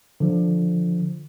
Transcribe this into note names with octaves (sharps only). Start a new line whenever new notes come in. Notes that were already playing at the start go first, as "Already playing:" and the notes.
D3 F3